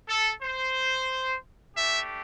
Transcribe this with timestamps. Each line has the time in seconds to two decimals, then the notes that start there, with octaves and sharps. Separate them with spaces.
0.08 A4
0.42 C5
1.77 A3 D4 G4 E5